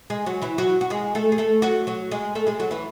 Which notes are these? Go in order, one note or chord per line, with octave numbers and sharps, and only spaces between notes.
G#3 G#4
F#3 F#4
E3 E4
F#3 F#4
F#4
G#3 G#4
A3 A4
G#4
A3 A4
F#3 F#4
F#3 F#4
G#3 G#4
A3 A4
G#3 G#4
F#3 F#4
E3 E4